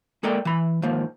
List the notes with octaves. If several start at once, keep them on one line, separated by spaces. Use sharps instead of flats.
G#3 A#3 A4 A#4 D5 G5
E3 B5
D#2 G#2 F3 A#3